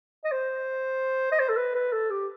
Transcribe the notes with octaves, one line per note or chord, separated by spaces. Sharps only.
D#5
C5
D#5
C5
A4
B4
B4
A4
G4